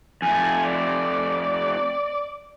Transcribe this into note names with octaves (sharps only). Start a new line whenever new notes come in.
F2 A3 G#5
D5